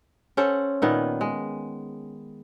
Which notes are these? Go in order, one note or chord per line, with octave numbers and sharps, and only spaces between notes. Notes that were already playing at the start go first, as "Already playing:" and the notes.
C#4 A4 C5 F#5
A#2 D#3 B3
G#3